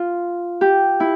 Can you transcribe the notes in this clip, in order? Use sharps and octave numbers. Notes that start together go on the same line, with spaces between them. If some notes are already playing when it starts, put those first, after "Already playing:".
Already playing: F4
G4
E4